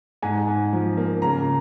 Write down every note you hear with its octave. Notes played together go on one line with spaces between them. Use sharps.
G#2 G#5
G#2
F3
A#3
C#3 A#5